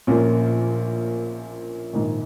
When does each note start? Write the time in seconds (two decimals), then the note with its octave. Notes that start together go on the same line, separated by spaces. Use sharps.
0.07 A#1 A#2 F3 A#3 C#4
1.93 A#1 G#2 D#3